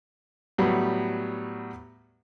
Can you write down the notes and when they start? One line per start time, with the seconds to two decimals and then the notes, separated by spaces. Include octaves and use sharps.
0.58 A2 F#3 G3 B3